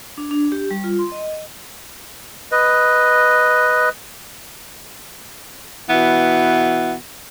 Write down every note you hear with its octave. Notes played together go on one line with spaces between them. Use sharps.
D4
D4
G4
G3
F4
C6
D#5
B4 D#5
B2 E3 B3